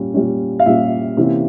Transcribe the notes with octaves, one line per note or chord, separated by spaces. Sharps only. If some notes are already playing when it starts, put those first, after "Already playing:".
Already playing: A#2 G3 C#4
A#2 G3 C#4
F5
A#2 G3 C#4 E5
C3 E3 A#3 C#4